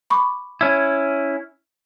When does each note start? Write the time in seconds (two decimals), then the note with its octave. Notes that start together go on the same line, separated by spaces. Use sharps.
0.10 B5 C#6 D6
0.61 C#4 E4